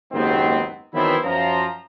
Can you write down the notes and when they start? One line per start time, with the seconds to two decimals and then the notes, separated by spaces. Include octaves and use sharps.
0.13 F#1 D#2 G#2 D#3 B3 C4
0.94 D#3 E3 F#3 B3 C4 E4
1.24 F#2 F3 A#5